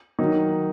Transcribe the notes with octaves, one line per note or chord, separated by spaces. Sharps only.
D#3 F#3 D#4